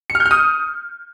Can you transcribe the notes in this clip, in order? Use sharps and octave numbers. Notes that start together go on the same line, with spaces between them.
C#7
F6
G6
F6
D#6